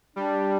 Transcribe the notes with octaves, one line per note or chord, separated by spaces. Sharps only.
G3 D4